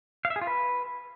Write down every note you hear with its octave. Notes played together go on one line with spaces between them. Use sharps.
F5
E5
G#4
F4
B4